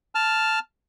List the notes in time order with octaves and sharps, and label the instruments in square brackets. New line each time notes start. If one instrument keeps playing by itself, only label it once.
[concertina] A5 F6